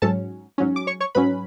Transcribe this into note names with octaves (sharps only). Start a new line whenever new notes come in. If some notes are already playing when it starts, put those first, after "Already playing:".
G#2 F#3 C#4 A4 A5
G#2 F#3 C#4
D6
C#5 C#6
C#5 C#6
G#2 F#3 C#4 B4 B5